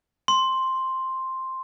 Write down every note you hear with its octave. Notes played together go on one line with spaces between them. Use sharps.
C6